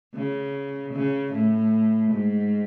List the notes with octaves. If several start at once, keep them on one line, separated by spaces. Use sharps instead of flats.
C#3
C#3
A2
G#2